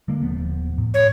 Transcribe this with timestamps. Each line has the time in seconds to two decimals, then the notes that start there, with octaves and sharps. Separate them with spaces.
0.08 D3 G#3 A#3
0.23 D#1 F3 B3
0.78 A2
0.94 C#5